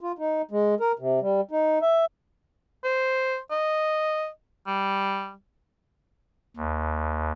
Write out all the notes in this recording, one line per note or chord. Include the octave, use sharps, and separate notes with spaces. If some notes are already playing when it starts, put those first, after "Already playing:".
F4
D#4
G#3
A#4
C3
G3
D#4
E5
C5
D#5
G3
D#2